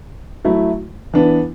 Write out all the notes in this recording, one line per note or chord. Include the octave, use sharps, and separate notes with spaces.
F#3 A3 E4
E3 B3 D4